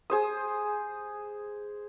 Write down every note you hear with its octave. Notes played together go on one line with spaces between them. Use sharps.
G#4 C5 D#6